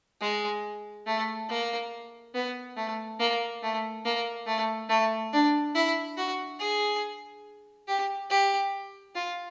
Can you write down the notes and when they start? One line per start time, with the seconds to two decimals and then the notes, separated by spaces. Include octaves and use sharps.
0.21 G#3
1.07 A3
1.50 A#3
2.34 B3
2.77 A3
3.20 A#3
3.63 A3
4.05 A#3
4.47 A3
4.89 A3
5.33 D4
5.75 E4
6.17 F#4
6.60 G#4
7.88 G4
8.31 G4
9.15 F4